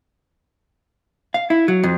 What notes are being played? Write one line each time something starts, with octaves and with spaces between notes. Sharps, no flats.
F5
E4
F#3
F2